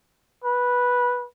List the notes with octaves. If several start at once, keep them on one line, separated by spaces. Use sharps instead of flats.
B4